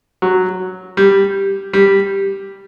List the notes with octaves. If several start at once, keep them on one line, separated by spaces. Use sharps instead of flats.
F#3
G3
G3